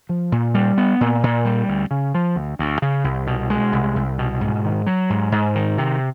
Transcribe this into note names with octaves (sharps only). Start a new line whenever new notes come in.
F3
A#2
G3
B3
A#2
A#2
G3
D2
C#3
F3
D2
D2
C#3
C2
B2
G#3
C2
C2
B2
G#2
D#3
F#3
G#2
G#2
D#3
C3